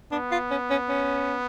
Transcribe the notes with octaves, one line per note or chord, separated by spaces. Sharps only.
B3 D4
F4
C#4
C#4
C#4